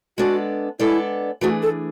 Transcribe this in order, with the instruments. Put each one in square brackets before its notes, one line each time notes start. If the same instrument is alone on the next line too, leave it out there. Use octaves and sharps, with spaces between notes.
[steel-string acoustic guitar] G#3 B3 D4 A4 D5 [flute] F#4
[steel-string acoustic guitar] G#3 B3 D4 A4 D5 [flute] E4
[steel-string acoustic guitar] E3 A3 D4 G#4 [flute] F#4
[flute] A4